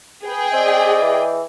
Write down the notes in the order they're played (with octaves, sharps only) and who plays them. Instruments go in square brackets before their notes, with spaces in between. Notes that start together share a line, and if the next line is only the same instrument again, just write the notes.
[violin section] G#4 G5 [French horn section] B4
[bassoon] C4 [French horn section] D5 D#5
[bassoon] E3